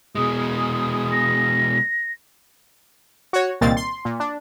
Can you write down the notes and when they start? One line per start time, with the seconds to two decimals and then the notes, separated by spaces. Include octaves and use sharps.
0.15 B2 G#3 G#4 D#6
1.12 A#6
3.33 F#4 C#5
3.61 C2 A#2 D#3 A#3 C4 A6
3.77 C6
4.05 A#2
4.20 D4